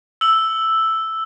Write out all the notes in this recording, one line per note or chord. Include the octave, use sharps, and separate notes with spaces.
E6 F#7